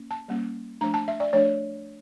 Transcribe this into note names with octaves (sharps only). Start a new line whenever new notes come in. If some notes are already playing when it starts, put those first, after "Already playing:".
Already playing: A#3 C#4
A5
G3 A#3 C#4
F3 A3 D4 A#5
A5
E5
D5
F3 A3 D4 C#5